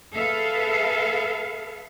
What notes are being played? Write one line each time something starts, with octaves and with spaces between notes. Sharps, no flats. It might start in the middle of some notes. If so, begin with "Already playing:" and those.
G#4 A4 B4 E5 F5